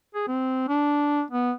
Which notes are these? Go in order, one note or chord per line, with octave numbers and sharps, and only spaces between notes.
G#4
C4
D4
B3